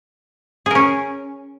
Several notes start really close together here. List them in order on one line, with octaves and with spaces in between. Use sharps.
G#4 A#4 C#4